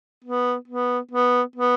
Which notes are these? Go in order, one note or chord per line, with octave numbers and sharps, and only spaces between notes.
B3
B3
B3
B3